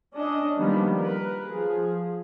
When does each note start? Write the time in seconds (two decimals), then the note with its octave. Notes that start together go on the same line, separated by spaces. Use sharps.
0.13 C#4 D4 D#5
0.57 D#3 F3 G3 A#3 B3
0.97 A#4 B4
1.46 F3 G#4